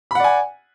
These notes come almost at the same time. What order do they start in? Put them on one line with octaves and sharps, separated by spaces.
B5 F#5 D5 G#5